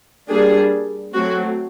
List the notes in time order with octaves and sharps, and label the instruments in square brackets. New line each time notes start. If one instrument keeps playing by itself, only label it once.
[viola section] G3 A#3 D4 G#4
F#3 A3 C4 F#4